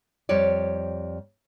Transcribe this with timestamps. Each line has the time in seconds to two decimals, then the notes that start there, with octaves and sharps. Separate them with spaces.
0.29 F2 G3 C#5 D5